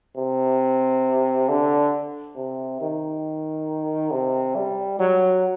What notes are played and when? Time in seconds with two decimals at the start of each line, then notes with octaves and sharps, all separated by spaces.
0.16 C3
1.49 D3
2.36 C3
2.81 D#3
4.11 C3
4.56 G3
4.99 F#3